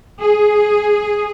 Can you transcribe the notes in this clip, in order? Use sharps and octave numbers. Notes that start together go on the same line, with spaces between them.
G#4